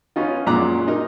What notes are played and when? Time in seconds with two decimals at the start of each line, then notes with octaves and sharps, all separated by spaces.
0.16 B3 C#4 D#4 F4
0.46 F#2 A#2 G#3 A#5 D6 F#6
0.88 D#4 A#4